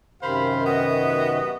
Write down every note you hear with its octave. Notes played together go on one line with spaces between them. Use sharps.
F#2 C3 D#3 C5 F5 B5
B3 F#4 D#5